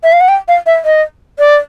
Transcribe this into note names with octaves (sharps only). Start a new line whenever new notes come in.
E5
F5
F#5
G5
F5
E5
D#5
D5